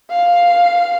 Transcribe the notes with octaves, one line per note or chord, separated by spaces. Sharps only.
F5